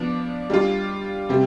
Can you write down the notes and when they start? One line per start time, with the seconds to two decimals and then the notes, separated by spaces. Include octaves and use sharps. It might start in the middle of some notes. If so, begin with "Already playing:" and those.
Already playing: F3 B3 D4
0.50 G3 D4 F4
1.29 C3 G3 C4